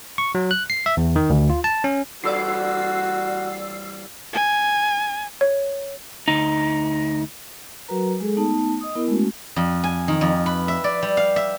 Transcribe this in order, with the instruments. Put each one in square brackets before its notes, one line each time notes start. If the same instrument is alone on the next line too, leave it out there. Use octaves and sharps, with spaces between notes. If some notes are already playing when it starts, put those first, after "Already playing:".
[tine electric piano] C#6
F#3
F#6
C7
E5
E2
D#3
D2
F4
A5
C#4
[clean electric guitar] E3 G3 A4 [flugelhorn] F#4 [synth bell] D5 E6 C7
[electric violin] G#5
[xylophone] C#5
[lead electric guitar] D2 D#4
[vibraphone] F#3 F#4 A#4 B4 A#5
G#3 G#4 A4
A3 B3 D#4 A5
D#5 D#6
B3 E4 A#4
G#3 A3 C#4 F#4
[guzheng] F2
G#5
D#3
F2
B4
E5
D5
G3
F5
E5